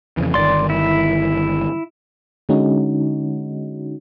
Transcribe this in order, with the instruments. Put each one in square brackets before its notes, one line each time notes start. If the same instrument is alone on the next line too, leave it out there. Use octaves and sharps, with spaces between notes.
[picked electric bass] F2 C#3 E3
[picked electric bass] G1 D#3 [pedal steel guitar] D5 C6
[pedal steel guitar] E4
[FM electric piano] D3 G#3 C#4 D#4 F#4